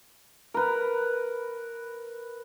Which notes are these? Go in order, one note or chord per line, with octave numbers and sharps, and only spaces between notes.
A#4 B4